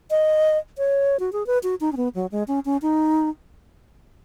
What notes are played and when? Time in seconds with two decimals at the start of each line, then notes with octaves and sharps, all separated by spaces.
0.11 D#5
0.78 C#5
1.19 F#4
1.33 G#4
1.47 B4
1.63 F#4
1.81 D#4
1.92 C#4
1.97 B3
2.15 F#3
2.32 G#3
2.48 C#4
2.65 C#4
2.82 D#4